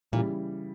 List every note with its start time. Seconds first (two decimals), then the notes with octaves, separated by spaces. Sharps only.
0.12 A#2 C#3 E3 G3